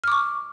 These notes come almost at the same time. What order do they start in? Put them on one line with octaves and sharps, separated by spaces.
F6 D6 C#6